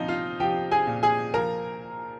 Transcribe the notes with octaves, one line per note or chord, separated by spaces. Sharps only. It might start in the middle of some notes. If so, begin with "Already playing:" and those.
Already playing: A#2 F3 C4 D#4 D#5
F4 F5
F3 G4 G5
G#4 G#5
A#2
G#4 G#5
F3 A#4 A#5